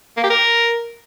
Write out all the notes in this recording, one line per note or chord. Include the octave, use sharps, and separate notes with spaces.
A#3
G4
A#4